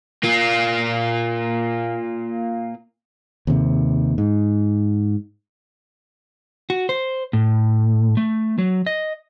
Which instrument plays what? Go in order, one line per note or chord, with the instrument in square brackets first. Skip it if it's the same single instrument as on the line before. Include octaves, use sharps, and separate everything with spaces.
[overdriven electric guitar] A#3 F4
[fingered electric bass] D#2 C3
G#2
[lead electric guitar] F#4
C5
A2
A3
F#3
D#5